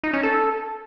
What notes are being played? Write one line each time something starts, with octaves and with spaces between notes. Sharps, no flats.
D#4
C#4
A4